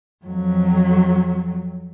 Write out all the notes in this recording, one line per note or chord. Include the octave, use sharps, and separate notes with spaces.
F2 F#3